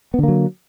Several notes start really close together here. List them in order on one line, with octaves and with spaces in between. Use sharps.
B3 D3 A#3 F#3